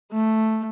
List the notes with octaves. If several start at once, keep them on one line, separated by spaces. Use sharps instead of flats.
A3